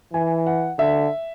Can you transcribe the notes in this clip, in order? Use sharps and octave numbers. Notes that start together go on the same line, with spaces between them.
E3 G#5
F#5
D3 E5